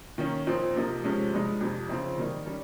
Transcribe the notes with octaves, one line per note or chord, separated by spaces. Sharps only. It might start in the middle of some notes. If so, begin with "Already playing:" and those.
D#3 A#3 C#4
A#2 F3 C4 D#4
C3 F3 A#3 D#4
C3 F3 G#3 C#4
G2 F3 G#3 D#4
F2 C3 F3
C#3 F3 C4 D#4
D#3 G3 A#3 D#4
G3 C#4